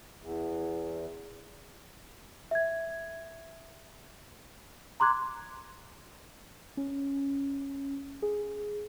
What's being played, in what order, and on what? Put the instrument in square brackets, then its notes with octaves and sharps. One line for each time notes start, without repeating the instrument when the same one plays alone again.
[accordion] E2
[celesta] E5 G#6
A#5 C6 D6 F#6 G#6
[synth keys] C#4
G#4